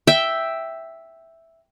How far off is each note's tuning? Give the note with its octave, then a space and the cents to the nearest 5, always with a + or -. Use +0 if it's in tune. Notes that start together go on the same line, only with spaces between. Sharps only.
E5 +0 G5 +0